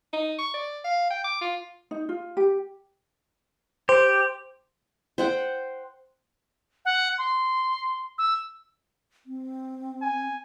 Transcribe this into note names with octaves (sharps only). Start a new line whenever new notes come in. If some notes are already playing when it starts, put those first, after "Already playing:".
D#4
C#6
D5
F5
G5
D6
F4
D#4
F4
G4
G4 C5
C5 F#5 G5
F#5
C6
E6
C4
G#5